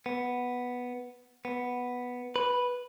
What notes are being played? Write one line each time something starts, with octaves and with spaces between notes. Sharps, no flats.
B3
B3
B4